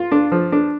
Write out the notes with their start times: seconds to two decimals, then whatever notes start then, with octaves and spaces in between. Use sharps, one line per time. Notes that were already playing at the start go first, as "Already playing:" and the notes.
Already playing: F4
0.12 D4
0.32 F3
0.52 D4